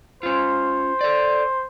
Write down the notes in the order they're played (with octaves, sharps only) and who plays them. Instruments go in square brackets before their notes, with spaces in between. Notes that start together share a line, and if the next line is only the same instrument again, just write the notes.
[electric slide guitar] C#4 F4 [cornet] C5
[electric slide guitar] A4 D5